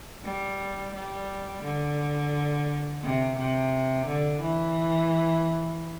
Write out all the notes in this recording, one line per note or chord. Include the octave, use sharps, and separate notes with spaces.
G3
G3
D3
C3
C3
D3
E3